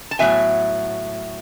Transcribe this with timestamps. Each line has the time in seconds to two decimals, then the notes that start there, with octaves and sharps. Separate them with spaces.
0.11 A5
0.19 A2 F#3 B3 E5 G#5